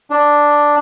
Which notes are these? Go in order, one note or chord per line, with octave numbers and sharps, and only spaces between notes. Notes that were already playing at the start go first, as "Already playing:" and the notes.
D4